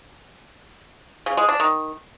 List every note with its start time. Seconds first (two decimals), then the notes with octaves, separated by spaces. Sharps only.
1.26 C#3
1.37 G#3
1.49 D4
1.60 D#3